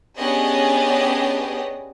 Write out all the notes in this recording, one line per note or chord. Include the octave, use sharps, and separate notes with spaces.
B3 C#4 D4 G4 G#4 D#5